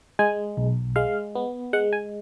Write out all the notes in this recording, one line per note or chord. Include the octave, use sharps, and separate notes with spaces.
G#3 G#5
B1
G#3 F5
B3
G#3 F#5
G#5